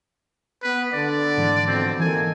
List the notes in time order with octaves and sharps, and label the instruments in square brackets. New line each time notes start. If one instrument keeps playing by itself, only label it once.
[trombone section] B3 [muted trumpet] B4
[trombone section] D3 [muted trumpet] D5
[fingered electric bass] G#2 E3 G#3
[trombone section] F2 B2 D3 [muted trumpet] C4
[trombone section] D#3 A#3 A4 [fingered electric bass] E3 [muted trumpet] G#5